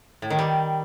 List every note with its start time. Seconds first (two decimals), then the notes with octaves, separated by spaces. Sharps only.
0.22 A2
0.30 D#3
0.39 G3